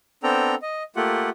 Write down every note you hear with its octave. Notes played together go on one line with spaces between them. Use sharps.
B3 C4 D4 A4 G5 A#5
D#5
A3 A#3 F4 G4 F#5